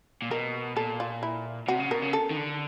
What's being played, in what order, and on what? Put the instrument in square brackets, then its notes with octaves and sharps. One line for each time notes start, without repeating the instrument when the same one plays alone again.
[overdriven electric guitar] A#2
[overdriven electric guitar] B2 [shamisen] A#4
[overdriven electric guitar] A#2 [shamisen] A4
[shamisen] F4
E4
[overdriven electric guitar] C3 [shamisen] F#4
[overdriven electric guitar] C#3
[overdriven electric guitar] B2 [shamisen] A#4
[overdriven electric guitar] C#3
[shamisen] A4
[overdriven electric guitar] D#3
D3